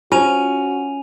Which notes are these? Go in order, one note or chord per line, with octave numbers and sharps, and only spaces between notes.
C#4 F4 F#4 C5 G#5 D#7 F7